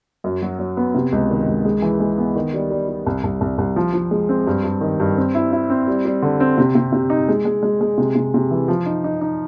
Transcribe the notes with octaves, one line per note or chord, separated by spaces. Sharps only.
F#2
F#3
F#3
B3
C3
C#2
D#3
C#2
G#3
E3
G#3
B3
D#3
G3
G3
G3
C2
C2
C2
C2
F3
F3
G#3
C4
G2
G2
D#3
G2
C4
E4
E4
C4
G3
G3
D3
C4
C3
C3
C3
D#4
G#3
G#3
G#3
G#3
C3
C3
C3
E3
F3
D#4
D#4
D#4